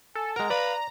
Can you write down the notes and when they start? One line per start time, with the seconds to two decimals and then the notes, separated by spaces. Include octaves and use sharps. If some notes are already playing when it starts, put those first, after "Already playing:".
0.15 A4 G#5
0.36 G#3 A#4 F#5 A#5
0.50 B4 D5 F5